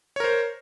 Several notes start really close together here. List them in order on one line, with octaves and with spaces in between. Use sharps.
C#5 A#4 C5